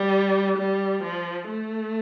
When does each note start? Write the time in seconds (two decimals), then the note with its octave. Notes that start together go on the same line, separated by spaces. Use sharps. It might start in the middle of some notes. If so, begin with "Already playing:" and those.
Already playing: G3
0.58 G3
1.03 F3
1.50 A3